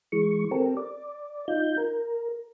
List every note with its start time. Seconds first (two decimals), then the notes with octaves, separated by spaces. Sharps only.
0.12 E3 G#3 C#6
0.51 C4 G4 A4 A#4
0.77 D5
1.48 D#4 F4 G6
1.78 A#4